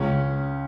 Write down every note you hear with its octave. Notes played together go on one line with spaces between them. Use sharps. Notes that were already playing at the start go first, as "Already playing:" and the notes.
Already playing: C#2 C#4